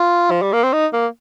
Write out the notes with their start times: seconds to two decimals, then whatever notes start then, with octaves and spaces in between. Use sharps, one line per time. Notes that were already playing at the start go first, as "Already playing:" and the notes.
Already playing: F4
0.31 F3
0.42 G3
0.53 A#3
0.63 C4
0.73 D#4
0.93 A#3